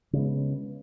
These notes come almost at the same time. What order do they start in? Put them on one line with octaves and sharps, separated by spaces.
C#3 G#3 B3